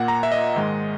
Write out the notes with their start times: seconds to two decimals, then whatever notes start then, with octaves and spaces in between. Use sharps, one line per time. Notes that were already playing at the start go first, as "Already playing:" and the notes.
Already playing: A#2 A#3 F#5
0.08 A#5
0.23 E5
0.32 D#5
0.56 G#2 D#3 G#3